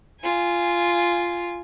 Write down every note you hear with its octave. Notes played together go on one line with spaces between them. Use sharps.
F4 G#5